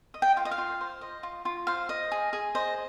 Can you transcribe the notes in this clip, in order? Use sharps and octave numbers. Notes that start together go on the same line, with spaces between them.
D#5
G5
F4
D#5
F5
F4
C5
D#5
F4
F4
C5 F5
D#5
G#4
G#4
C5 D#5